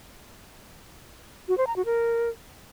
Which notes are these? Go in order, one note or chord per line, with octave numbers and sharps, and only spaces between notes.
F#4
C5
A#5
F#4
A#4